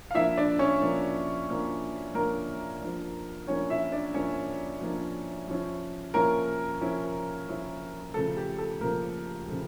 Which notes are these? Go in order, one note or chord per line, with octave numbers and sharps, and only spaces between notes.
F5
F3 A#3 D4 E4 E5
D4 D5
C#4 C#5
F3 A#3 D4
F3 A#3 D4
F3 A#3 D4 A#4
F3 A#3 D4
F3 A#3 C#4 D4 C#5
E4 E5
D4 D5
F3 A#3 C#4 D4 C#5
F3 A#3 D4
F3 C#4 E4
F3 A#3 C#4 E4 A#4
F3 C#4 E4
F3 C#4 E4
C#3 F3 A3 A4
G4
A4
C#3 F3 A3 A#3 A#4
C#3 F3 A3